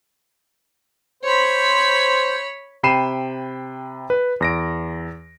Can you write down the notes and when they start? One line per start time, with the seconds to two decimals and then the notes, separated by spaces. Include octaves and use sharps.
1.23 C5 C#5 B5
2.83 C3 G5 B5 C7 D#7 E7
4.10 B4
4.40 E2 A#6 D7